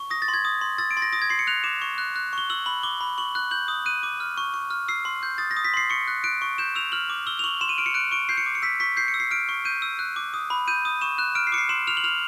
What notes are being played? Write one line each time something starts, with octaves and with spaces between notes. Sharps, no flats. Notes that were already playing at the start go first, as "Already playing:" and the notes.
Already playing: C#6
D#6 A#6
A6
C6
G#6
D#6
C6
E6 A6
D7
C6 A6
A#6
D#6 A#6
G#6
C6 C7
C#7
F#6 F7
D6 E7
C#6
F#6
F#6
C#6 G7
E6 F#7
B5 F#7
D6 G7
B5
C#6 F#7
F#6
G6 F#7
D#6
F#6 D#7
D6
F6
C#6
C#6
F6
E6 C7
C6
G6
D#6 A6
A#6
D#6
B6
C6 C7
C#6 C#7
F#6
F#6 D7
C#6
G6 E7
E6 F7
F6 F#7
D6
E6 G7
F7
C#6 F#7
C6 E7
D#7
F6 D7
C#7
F#6 D7
C#6 D7
G6 C7
C#7
D6
C#7
E6 B6
C#6 B6
G6 C7
C#7
E6
C7
F6 D7
C#6
G6 D#7
E6
F#6
D6
D#6
B5
G6 D#7
D#6
C#6 E7
F#6 E7
F6 D7
C7
D6 C#7
C7
C6 E7
F6 F7
F#7
F6 F7